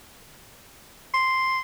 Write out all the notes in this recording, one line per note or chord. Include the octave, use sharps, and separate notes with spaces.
C6